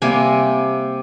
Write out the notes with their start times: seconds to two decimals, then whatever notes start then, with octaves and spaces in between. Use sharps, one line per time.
0.02 C3 G3 A#3 G#5